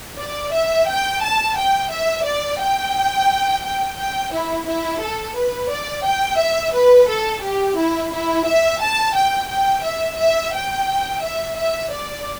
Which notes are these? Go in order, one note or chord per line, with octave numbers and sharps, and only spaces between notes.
D5
E5
G5
A5
G5
E5
D5
G5
G5
G5
E4
E4
A4
B4
D5
G5
E5
B4
A4
G4
E4
E4
E5
A5
G5
G5
E5
E5
G5
E5
E5
D5